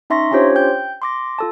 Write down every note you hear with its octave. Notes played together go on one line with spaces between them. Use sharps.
C#4 D#4 E5 C6 C#6 A#6
C#4 D4 F4 G4 C5 C#5
G5 G6
C6 D6 A#6
F4 A4 A5